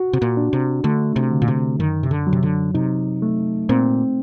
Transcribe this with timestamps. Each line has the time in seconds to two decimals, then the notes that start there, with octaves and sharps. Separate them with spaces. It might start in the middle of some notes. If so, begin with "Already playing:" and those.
Already playing: F#4
0.13 C3
0.22 A#2
0.37 D4
0.53 C3
0.84 D3 A3
1.16 C3
1.32 D3
1.42 A#2
1.48 C3
1.79 F#2 D#3
2.03 C3
2.11 D3
2.27 F#3
2.33 C3
2.43 D3
2.74 C3 D#4
3.22 A3
3.69 A#2 C4